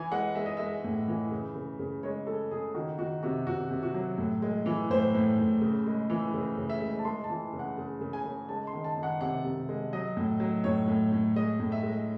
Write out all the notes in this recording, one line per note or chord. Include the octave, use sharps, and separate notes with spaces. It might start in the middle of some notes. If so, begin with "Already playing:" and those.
Already playing: E3 G#5
G#3 F#5
G#3 E5
D#5
G#3 E5
A2
E3
C#3
C#3
C#3
G#3 C#5
G#3 A4
C#3 G#4
D#3 F#4
D#3 F#4
C3 F#4
C3 F#4
C3
F#4
F#3
A2
G#3
E3
A2 C5
A2
A2
C#3
G#3
E3
C#3
C#3
E5
G#3
A5
G#3 C6
A5
E3
C#3
F#5
C#3
C#3
G#5
C#3
G#3 A5
C6
D#3
A5
D#3
F#5
C3 F#5
C3
G#3
F#3 D#5
A2
F#3
A2 C#5
A2
A2
G#3 D#5
A2
E5
G#3